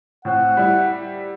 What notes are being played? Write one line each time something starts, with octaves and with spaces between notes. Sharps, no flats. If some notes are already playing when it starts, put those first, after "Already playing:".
A2 C4 F#5
G3 E4